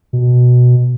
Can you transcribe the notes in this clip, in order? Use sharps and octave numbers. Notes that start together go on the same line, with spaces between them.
B2